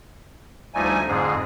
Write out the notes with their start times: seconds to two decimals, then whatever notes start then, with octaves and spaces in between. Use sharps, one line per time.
0.75 D2 F3 G3 A3 D#4 G#5
1.07 F2 G#2 D3 G#4